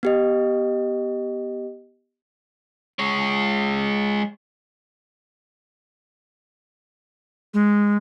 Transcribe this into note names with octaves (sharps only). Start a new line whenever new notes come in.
B3 G4 D#5
G#3 C#5
G#3